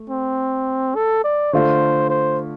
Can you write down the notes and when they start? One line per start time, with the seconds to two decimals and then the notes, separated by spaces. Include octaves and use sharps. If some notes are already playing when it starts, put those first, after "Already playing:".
Already playing: A3
0.10 C4
0.95 A4
1.24 D5
1.53 D3 A3 F4 C5
2.10 C5